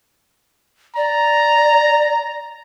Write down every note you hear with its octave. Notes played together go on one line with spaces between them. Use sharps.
D5 A#5